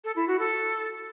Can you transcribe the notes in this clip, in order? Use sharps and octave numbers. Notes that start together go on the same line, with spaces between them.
A4
E4
F#4
A4